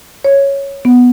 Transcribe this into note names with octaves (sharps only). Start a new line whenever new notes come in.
C#5
B3